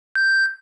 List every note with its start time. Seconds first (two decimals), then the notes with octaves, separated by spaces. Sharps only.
0.15 G6